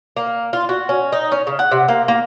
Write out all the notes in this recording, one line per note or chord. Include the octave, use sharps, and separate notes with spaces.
A#3
F4
F#4
C#4
D#4
C#4
C#3
F#5
C3
A#3
A#3